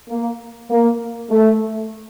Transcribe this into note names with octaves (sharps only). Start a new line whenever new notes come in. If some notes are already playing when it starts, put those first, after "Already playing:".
A#3
A#3
A3